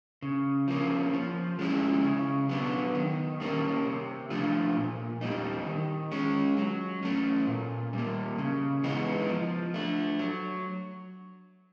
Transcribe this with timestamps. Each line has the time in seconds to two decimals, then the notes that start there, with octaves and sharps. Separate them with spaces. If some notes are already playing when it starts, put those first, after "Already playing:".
0.22 C#3
0.68 F3 A#3 C#4
1.14 F3
1.59 G#3 C#4 E4
2.04 C#3
2.49 F#3 B3 D4
2.95 D#3
3.40 G3 A#3 C#4
3.85 C3
4.30 F3 A3 D4 F4
4.76 A#2
5.21 G3 C4 D#4
5.67 D#3
6.12 G#3 C#4
6.57 F#3
7.03 A3 C#4
7.48 A#2
7.93 G3 A#3
8.38 C#3
8.83 E3 G#3 B3 D#4
9.29 F3
9.74 A3 D4
10.19 F#3